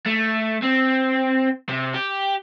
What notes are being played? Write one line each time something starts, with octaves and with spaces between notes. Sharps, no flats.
A3
C4
C3
G4